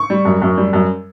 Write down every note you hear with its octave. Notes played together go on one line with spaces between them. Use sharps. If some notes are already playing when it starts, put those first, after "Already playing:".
Already playing: C#6
G3
F#2
F#2
G3
F#2